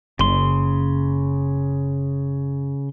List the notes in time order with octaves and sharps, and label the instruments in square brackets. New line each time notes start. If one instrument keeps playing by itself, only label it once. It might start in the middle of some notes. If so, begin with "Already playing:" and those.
[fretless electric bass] F#1 [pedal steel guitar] C#3 C6